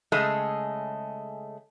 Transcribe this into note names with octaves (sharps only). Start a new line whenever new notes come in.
C#3 G#3 A3 G#4 A4 D#5